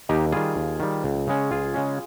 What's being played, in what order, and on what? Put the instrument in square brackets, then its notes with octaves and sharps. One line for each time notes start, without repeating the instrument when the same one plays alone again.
[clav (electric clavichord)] D#2 D#4 G4
D#3 G3 F4 G#4
D#2
D#3 G3
C#2
C#3 G#3 C#4
C#2 F4 G#4
C#3 G#3 C#4